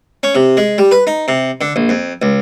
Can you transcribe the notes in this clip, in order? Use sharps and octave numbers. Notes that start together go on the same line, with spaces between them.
C#4
C3
G#3
G3
B4
D#4
C3
D3
A#1
F2
C#2